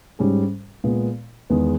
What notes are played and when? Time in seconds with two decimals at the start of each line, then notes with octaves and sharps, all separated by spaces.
0.19 G#2 G3 C#4 G#4
0.84 A#2 G#3 B3
1.50 E2 D#3 G#3 B3